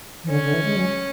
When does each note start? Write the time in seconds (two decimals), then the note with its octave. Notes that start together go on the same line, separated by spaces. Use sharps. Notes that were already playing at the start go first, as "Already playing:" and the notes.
0.24 E3
0.30 D3 C#4
0.44 D3
0.54 E3
0.64 G#3
0.76 F#3